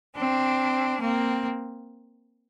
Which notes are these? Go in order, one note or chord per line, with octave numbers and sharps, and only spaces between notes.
C4 D4
A#3 C4